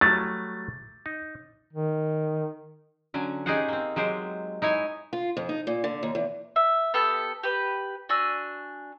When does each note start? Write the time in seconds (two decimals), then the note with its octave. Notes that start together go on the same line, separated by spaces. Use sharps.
0.01 F#3 G3 A3 A6
1.06 D#4
1.73 D#3
3.14 D3 F#3 C#4
3.46 C#4 D#4 G4 G#4 C5 F#5
3.68 A#3 C4
3.96 F#3 G#3 G4 C5
4.62 D#4 E4 C#5 G#5
5.13 F4
5.37 F2
5.49 D#4
5.67 A#2
5.84 D3
6.03 D#2
6.15 E2
6.56 E5
6.94 B3 G4 A4
7.43 G4 B4
8.09 D4 F#4 G#5 E6